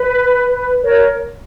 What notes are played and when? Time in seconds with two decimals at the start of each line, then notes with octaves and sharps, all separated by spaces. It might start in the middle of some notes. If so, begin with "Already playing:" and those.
Already playing: B4
0.82 A#4 C#5